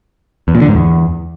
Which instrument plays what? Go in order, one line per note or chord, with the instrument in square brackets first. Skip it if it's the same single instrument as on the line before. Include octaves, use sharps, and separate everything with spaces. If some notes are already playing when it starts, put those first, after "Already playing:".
[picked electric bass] E2
A#2
D3
G#2
E2